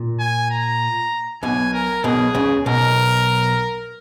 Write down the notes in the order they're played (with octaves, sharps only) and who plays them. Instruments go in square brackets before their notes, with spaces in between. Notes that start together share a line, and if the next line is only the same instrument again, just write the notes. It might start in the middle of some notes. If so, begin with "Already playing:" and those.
Already playing: [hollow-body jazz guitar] A#2
[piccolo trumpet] G#5
A#5
[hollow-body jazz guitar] B1 B2 [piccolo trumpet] G#5
[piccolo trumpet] A#4
[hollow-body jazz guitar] B1 B2 [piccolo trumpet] G#4
[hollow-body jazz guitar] C#2 C#3
[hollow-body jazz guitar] B1 B2 [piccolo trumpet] A#4